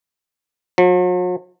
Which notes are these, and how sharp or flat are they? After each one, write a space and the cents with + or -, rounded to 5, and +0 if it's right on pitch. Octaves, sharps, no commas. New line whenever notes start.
F#3 -45